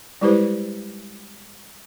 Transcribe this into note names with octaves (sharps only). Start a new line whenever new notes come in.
G3 G#3 E4 G4 B4 C5